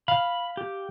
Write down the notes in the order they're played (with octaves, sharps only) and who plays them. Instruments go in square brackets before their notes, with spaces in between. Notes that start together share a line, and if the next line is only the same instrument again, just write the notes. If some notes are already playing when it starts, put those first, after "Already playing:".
[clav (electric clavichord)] F5 [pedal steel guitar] B5
[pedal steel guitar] G4